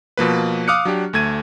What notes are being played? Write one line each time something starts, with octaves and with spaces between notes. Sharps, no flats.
B2 F3 A#3 B4
F5 D6 D#6 F6 F#6 C#7
F#3 D4 G4
D2 A3 G#6 D#7